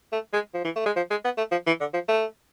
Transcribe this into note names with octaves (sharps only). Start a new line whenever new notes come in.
A3
G#3
F3
E3
A3
G#3
F3
G#3
B3
A3
F3
E3
D3
F3
A3